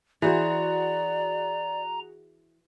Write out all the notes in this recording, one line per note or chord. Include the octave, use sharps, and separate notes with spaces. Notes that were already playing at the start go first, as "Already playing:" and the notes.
E3 F#4 G#4 C5 D5 A#5